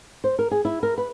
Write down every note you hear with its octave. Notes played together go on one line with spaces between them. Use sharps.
C5
A#4
G#4
E4
A#4
B4